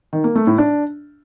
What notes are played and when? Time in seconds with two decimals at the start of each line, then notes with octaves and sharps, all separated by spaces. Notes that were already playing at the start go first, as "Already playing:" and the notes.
0.13 D#3
0.24 A#3
0.35 A3
0.47 A2
0.58 D4